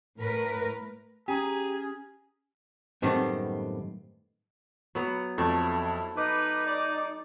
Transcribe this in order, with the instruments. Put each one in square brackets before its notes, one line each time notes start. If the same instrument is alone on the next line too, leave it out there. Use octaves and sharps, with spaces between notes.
[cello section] A2 A#4 B4
[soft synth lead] C#4 [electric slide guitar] G4 [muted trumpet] G#4 [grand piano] G#5 A#5
[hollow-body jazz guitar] F#2 A2 D#3 G3 B3 C4
[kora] F#3 B3
[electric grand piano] F2 [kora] A3 [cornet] E4
[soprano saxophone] D#4 [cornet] B4 [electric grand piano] D6
[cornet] D5